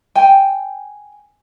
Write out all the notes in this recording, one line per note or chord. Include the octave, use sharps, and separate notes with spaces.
G5 G#5